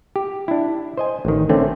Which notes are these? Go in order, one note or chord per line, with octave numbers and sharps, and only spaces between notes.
G4
D4 E4
C5 D#5 G#5
A1 D#3
D3 A3 C4 C#4